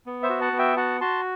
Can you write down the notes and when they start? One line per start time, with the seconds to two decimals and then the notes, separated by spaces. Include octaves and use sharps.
0.06 B3
0.23 C5 E5
0.30 F#4
0.41 F#5 A5
0.53 B3
0.59 E5 G5
0.76 F#4 F#5 A5
1.01 F#4 A5 C6